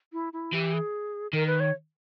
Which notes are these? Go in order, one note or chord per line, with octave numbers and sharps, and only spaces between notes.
E4
E4
E3 G4
G#4
D#3 A#4
B4
C#5